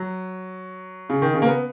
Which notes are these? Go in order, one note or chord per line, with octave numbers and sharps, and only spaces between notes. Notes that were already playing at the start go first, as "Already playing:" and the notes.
Already playing: F#3
C#3
D#3
C#3
A#3
B3